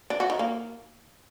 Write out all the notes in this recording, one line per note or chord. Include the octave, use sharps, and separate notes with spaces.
D4
F#4
D#3
A#3